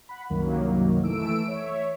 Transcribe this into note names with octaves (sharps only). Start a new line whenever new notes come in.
F#5 B5
C2 F#2 D#3 F#3 A#3
E3 A3 E6 D7
C#5 E5